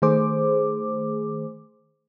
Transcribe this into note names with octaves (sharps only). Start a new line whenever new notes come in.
D#3 A3 G#4 C5 D6